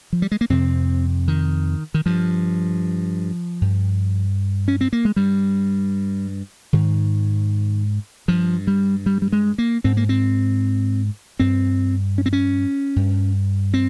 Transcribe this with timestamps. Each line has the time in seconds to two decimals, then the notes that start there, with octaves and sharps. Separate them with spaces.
0.13 F3
0.22 G3
0.32 G#3
0.41 A#3
0.50 F2 C3 C4
1.28 D#3
1.94 D#3
2.06 G2 F3
3.61 G2
4.68 C#4
4.81 C4
4.93 A#3
5.05 G#3
5.16 G2 G3
6.73 G#2 D#3
8.28 G2 F3
8.67 G3
9.06 G3
9.22 G3
9.32 G#3
9.58 A#3
9.84 G#2 C4
9.97 A#3
10.09 C4
11.39 G2 C4
12.18 C#4
12.26 C4
12.33 C#4
12.96 G2
13.74 C4